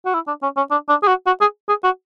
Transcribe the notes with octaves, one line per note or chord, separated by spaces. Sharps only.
F#4
E4
D4
C#4
C#4
D4
D4
G#4
F#4
F#4
G#4
G#4
F#4